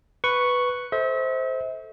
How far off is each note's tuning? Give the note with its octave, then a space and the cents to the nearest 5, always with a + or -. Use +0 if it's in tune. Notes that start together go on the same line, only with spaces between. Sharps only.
B4 +0 C#6 +0
A4 +0 C5 +0 E5 -40